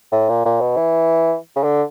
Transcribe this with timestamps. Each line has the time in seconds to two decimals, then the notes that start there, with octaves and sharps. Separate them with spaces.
0.12 A2
0.29 A#2
0.45 A#2
0.61 B2
0.77 E3
1.56 C#3
1.64 D3